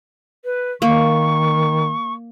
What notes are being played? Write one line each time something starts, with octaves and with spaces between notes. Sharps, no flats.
B4
D#3 A#3 C#6